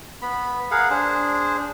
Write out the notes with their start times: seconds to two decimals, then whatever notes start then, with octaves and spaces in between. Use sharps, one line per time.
0.22 B3 B5
0.71 G#4 A#4 F5 F#5
0.90 D4 G#4 C5